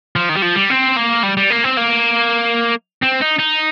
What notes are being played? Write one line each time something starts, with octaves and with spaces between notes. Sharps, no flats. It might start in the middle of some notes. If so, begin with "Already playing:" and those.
F3
D#3
G3
F3
G3
C4
A#3
G3
G3
A#3
C4
A#3
C4
D#4
D#4